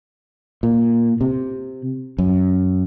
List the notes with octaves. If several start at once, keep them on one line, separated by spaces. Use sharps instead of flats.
A#2
C3
F#2